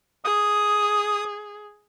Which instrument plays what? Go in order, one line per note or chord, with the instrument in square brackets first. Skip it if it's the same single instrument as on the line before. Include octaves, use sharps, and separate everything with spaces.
[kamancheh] G#4 [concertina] D#6